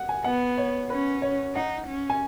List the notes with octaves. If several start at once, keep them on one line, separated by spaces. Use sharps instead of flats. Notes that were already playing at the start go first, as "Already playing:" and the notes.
Already playing: F#5
G#5
B3 F#5
C#5
C#4 B4
C#5
D#4 F#5
C#4
G#5